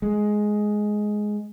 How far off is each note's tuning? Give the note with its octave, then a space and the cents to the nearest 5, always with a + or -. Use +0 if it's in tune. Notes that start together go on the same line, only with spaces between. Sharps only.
G#3 +10